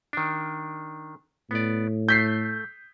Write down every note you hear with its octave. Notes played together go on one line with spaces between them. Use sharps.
D#3 D4
A2 B3 D5
A3 G6 B6 C7